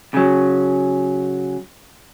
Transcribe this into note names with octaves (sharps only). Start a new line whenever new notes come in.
C#3 F#3